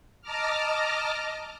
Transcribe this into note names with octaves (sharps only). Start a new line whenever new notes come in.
D#5 A5 A#5 D6 F6